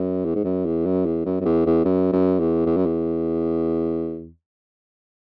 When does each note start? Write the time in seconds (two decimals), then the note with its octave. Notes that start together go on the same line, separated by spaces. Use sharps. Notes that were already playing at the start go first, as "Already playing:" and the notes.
Already playing: F#2
0.25 E2
0.35 G#2
0.44 F#2
0.65 E2
0.86 F#2
1.06 E2
1.26 F#2
1.41 F#2
1.45 E2
1.66 E2
1.85 F#2
2.13 F#2
2.40 E2
2.66 E2
2.77 F#2
2.86 E2